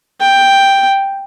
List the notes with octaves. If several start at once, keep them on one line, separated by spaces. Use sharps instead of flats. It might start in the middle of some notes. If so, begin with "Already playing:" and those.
G5